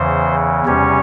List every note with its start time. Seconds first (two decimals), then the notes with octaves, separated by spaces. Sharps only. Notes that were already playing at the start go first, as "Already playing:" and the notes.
Already playing: E2 C#3 E3 C5
0.66 E2 C3 G3 C#4 C#5